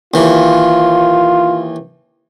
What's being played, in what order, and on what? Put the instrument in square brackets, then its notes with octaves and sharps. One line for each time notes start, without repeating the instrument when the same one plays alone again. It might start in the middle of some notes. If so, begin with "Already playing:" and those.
[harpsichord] D#2 E3 [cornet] F4